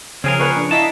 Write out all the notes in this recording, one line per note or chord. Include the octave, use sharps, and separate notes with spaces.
C#3 F3 C4 C#4 G#4 A#4
A#3 B4 C#6
D4
A#3 E4 D#5 A5 B6